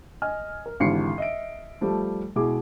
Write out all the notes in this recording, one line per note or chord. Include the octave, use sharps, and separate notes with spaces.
D#5 G#5 F6
A#4
G#1 D3 E3 G4 C7 C#7
D#5 E5 D7
F3 G3 A3
B2 G#3 E4 G#4 D6